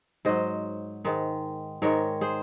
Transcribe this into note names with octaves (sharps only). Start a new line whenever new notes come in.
G#2 F#3 C5 D#5
G#2 D#3 G#3
G#2 D#3 G#3 A#4 C#5
G#4 C5